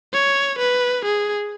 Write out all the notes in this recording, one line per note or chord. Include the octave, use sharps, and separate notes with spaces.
C#5
B4
G#4